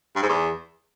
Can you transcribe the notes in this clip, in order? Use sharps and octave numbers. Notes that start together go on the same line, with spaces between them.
G2
G#2
E2